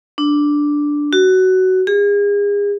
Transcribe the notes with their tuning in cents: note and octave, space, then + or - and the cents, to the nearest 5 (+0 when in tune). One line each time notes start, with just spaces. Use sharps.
D4 +0
F#4 +15
G#4 -35